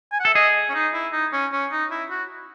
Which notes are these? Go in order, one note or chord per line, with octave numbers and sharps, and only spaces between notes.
G#5
F#5
A4 E5
G#4 D#5
C#4
D#4
E4
D#4
C#4
C#4
D#4
E4
F#4